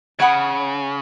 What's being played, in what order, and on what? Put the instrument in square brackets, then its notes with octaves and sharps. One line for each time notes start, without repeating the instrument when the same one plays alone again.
[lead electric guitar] C#3 [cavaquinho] C#5 F#5 B5 D#6